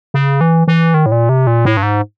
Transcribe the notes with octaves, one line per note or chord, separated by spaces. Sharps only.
C#3
E3
E3
D#3
A2
A#2
C3
A#2
A2
G2
G#2